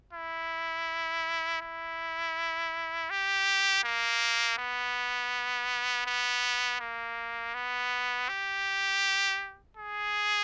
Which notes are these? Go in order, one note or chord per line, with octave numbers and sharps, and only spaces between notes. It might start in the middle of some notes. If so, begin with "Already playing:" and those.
E4
E4
G4
A#3
B3
B3
A#3
B3
G4
G#4